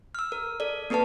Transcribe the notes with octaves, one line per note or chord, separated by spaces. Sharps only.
E6 F6
A#4
A4 D5
A#3 C4 A4 B4 A5